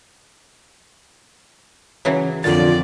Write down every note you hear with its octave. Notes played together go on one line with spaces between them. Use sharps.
C#3 E3 F#3
F2 A#2 D3 F4 D5 A6